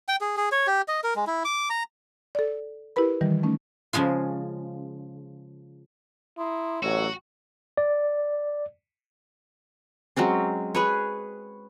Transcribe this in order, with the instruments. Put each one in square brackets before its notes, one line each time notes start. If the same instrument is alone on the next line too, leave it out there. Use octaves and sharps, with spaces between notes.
[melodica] G5
G#4
G#4
C#5
G4
D#5
A#4
G#3
E4
D6
A#5
[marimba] A4 D5
E4 G4 A#4 B4 B5
D#3 E3 G3
A3 C#4 D#4
[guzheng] C#3 F3 G#3 F4
[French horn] E4 [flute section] A#5 C6 D#6
[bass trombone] A1 [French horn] F#3 [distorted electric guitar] F#4 [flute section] C#5 E6
[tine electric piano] D5
[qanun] F#3 G#3 C4 C#4
G#4 B4 C#5